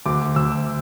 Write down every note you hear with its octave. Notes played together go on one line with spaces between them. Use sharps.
D2 D6
D2 E6